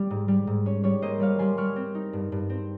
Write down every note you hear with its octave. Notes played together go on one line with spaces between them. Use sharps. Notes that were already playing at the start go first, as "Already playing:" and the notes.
Already playing: G3
G#2
G3
G#2
C#4 C#5
G3 C#5
A#3 C5 D#5
G3 C#5 F5
G3 G#5 C6
G3 C#6 F6
C4
D#4
G2
G2
C4